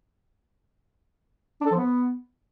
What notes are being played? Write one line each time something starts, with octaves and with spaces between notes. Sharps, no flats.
D4
A4
F3
B3